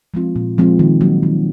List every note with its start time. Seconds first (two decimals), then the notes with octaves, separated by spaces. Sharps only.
0.14 F3 G#3 C4 F4
0.36 A#2
0.58 F3 G#3 C4 F4
0.79 D#3
1.01 F#3 A#3 D#4 F#4
1.23 D#3